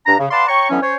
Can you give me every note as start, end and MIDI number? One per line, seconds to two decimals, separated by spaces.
0.06 0.14 43
0.06 0.14 62
0.06 0.14 82
0.19 0.26 49
0.31 0.45 71
0.31 0.45 74
0.31 0.45 77
0.31 0.45 78
0.31 0.45 81
0.31 0.45 84
0.48 0.70 73
0.48 0.70 79
0.48 0.70 82
0.48 0.70 85
0.70 0.80 50
0.70 0.80 52
0.70 0.80 54
0.70 0.80 59
0.70 0.80 61
0.82 0.96 61
0.82 0.96 72
0.82 0.96 73